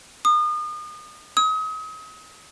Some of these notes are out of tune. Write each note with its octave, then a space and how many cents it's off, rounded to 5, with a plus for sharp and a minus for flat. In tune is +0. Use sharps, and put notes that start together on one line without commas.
D#6 -35
D#6 +35